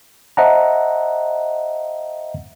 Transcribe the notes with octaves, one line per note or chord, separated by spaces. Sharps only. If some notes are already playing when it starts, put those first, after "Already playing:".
C5 D#5 E5 F#5 A5 A#5